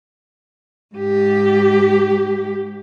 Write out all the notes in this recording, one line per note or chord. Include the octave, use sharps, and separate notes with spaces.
G#2 G4